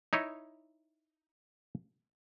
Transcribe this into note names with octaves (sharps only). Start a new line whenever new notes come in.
D#4 E4 C#5 D#5